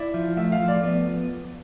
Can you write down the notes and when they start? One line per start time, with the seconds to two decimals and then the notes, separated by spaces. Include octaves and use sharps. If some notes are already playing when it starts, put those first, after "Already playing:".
Already playing: E4 D5
0.14 F3
0.37 A3 E5
0.52 F5
0.60 F3
0.68 D5
0.83 B3 D5